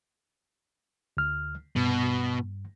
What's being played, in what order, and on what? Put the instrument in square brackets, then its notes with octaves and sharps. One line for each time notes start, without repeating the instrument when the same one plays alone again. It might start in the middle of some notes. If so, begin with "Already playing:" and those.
[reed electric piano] D2 F6
[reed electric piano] G2 [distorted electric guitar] B2